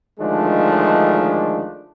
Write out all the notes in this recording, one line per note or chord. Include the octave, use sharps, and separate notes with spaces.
D2 D#3 F3 G#3 A3 D4